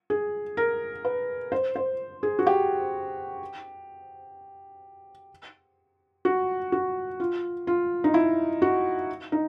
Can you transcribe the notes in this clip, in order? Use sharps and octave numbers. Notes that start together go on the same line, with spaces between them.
G#4
A#4
B4
C5
C5
G#4
F#4
G4
F#4
F#4
F4
F4
D#4
E4
F#4
D#4